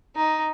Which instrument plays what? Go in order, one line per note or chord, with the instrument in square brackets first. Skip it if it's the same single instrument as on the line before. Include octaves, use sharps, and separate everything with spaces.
[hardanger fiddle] D#4